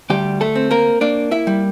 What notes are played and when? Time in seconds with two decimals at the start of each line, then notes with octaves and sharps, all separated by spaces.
0.10 D2 G3 G4
0.41 A3 A4
0.55 C4
0.71 A#3 A#4
1.01 A#3 D4 D5
1.31 E4 E5
1.47 G3